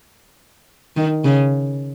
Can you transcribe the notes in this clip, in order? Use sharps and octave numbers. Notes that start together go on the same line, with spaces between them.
D#3
C#3